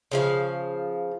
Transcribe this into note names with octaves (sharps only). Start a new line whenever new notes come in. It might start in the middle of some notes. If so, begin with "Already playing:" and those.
C#3 F3 F5